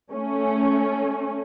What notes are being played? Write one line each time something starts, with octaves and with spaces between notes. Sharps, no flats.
A3 C#4